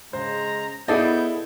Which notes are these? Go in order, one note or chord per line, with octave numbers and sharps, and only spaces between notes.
C#3 G#3 C5 A#5
B3 E4 G#4 A4 D5 D#5 G6